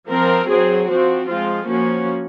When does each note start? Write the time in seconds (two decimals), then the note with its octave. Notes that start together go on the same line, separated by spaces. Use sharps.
0.09 F3 C4 A#4
0.49 F#3 C4 G#4
0.89 F3 C4 F#4
1.28 F3 G#3 C4 F4
1.68 F3 A#3 C#4 F#4